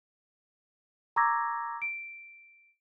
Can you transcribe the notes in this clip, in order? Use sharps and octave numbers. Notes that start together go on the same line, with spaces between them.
A#5 C#6 D6 E6 G#6 A#6
D7